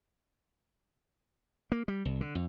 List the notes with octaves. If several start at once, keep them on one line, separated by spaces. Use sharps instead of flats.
A#3
G3
C2
D3
F2